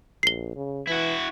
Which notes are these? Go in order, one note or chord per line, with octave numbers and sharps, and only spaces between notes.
A#1 C7 G7
C#3
E3 E4 F#4